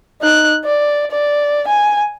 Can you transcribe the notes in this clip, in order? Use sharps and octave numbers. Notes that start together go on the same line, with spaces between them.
D#4 F#6
D5
D5
G#5